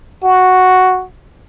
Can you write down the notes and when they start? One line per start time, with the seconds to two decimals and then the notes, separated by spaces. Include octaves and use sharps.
0.23 F#4